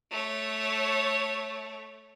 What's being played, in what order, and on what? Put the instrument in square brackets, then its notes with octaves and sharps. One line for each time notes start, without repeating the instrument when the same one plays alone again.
[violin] A3 C#5